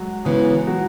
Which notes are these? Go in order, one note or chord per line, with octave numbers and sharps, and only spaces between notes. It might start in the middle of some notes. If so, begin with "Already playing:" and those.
Already playing: F#3 G#3 F#4
C#3 E3 G#3 B3 G#4
F#3 F#4